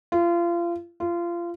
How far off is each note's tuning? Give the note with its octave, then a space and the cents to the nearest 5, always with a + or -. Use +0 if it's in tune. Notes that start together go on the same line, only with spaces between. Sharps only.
F4 -30
F4 -25